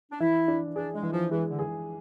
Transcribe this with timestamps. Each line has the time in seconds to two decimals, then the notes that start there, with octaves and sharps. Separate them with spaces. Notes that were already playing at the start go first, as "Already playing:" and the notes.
0.11 D4
0.20 E3 E4
0.48 D4
0.76 D4 G#4
0.94 G#3
1.03 E3
1.12 F3
1.31 E3 G#3
1.50 D3
1.59 G#4